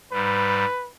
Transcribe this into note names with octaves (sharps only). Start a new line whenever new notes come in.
G#2 G3 B4